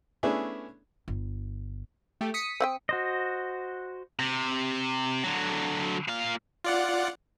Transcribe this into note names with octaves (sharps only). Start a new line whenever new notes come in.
A3 B3 C#4 D4 E4 G#4
G1
A3 G4
D#6 B6 C#7
C4 F#5 G5
F#4 C5 D#5
C3
D3 F#3
A#2 F5
F4 D5 F#5